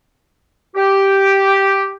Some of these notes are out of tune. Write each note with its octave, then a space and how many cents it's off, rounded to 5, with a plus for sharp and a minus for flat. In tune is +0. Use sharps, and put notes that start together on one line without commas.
G4 -5